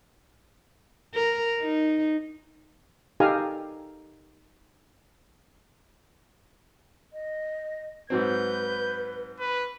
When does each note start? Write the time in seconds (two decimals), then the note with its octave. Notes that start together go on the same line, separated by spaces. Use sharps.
1.14 A#4
1.61 D#4
3.20 D#4 G4 A4 F5 G#5 A#5
7.13 D#5
8.10 G#2 F#3 C4 B4 G6
9.40 B4